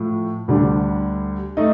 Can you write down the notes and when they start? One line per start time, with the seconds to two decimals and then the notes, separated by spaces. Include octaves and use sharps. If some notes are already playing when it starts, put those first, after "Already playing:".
Already playing: A2 F3 A3
0.48 D2 D3 G3 D4
1.57 A3 D#4